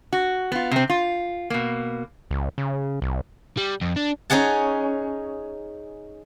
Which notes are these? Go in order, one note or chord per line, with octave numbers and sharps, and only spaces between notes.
F#4
B3 F4
C3 C4
F4
B2 A#3
C#2
C#3
C2
G3
F2
D4
C#4 D#4 G#4 F#5 A5